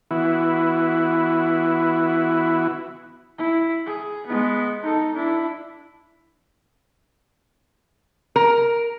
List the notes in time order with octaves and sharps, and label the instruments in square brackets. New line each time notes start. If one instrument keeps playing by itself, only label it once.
[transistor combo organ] E3 B3 E4 F#4
[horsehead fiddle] E4
G#4
G#3 B3
D#4 A4
D4 E4
[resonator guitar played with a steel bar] A#4